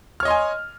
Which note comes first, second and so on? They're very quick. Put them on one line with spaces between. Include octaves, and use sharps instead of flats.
F6 C#5 D#5 C6 G#5